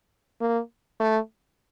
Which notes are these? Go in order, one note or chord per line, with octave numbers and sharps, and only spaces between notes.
A#3
A3